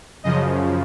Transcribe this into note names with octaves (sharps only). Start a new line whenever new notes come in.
F#2 C#3 F3 D#5